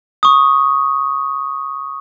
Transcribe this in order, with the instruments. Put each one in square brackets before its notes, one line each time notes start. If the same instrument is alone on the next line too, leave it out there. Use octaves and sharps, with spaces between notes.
[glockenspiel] C#6 D#6